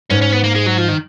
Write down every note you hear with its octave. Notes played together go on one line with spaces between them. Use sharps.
G#2 C#4
C#4
B3
A#3
G#3
F#3
F3
D#3